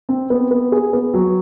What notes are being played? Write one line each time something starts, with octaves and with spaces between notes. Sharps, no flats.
C4
B3
B3
G#4
B3
F#3